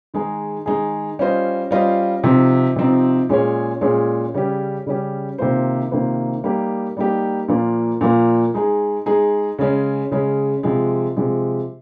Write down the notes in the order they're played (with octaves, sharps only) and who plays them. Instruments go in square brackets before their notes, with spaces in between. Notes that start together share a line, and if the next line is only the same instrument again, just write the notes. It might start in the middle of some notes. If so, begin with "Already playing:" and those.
[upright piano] D#3 G#3 D#4 G#4
D#3 G#3 D#4 G#4
G3 C#4 F4 C5 D#5
G3 C#4 F4 C5 D#5
C3 F3 C4 D#4
C3 F3 C4 D#4
A#2 G#3 C#4 G#4 C#5
A#2 G#3 C#4 G#4 C#5
C#3 G3 C#4 G4
C#3 G3 C#4 G4
C3 D#3 A#3 F4 C5
C3 D#3 A#3 F4 C5
G3 A#3 D#4 G4
G3 A#3 D#4 G4
A#2 F3 A#3
A#2 F3 A#3
G#3 D#4 G#4
G#3 D#4 G#4
C#3 G#3 C#4
C#3 G#3 C#4
C3 F3 G#3
C3 F3 G#3